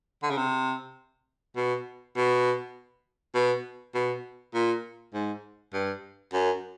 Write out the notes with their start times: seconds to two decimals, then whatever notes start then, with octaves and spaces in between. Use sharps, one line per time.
0.23 D3
0.30 C#3
0.38 C3
1.56 B2
2.16 B2
3.35 B2
3.94 B2
4.54 A#2
5.14 G#2
5.73 G2
6.33 F#2